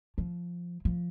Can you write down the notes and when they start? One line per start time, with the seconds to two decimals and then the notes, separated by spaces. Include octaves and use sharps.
0.18 F3
0.85 F3